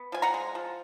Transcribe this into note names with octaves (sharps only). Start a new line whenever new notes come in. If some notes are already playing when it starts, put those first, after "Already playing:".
Already playing: B3
F3 G#5
F#5 A#5
G#3
F3